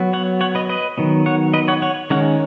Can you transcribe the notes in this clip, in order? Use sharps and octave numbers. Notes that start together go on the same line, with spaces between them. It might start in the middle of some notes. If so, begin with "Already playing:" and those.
Already playing: F#3 B3
C#5 F#5
C#5 F#5
B4 D#5
B4 D#5
D#3 F#3 B3
C#5 F#5
B4 D#5
C#5 F#5
C#5 F#5
D#3 G#3 C#4 C#5 F#5